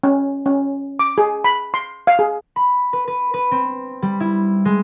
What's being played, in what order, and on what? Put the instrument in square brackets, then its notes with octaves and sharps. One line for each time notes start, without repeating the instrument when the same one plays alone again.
[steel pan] C#4
C#4
D6
G#4
B5
C6
F5
G#4
[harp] B5
B4
B4
B4
C4
G3
E4
G#3